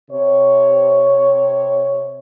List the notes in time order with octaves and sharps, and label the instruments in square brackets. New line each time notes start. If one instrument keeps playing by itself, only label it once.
[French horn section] C3 C#5